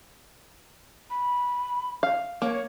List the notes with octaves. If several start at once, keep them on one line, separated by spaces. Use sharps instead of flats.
B5
F5
A#3 C#5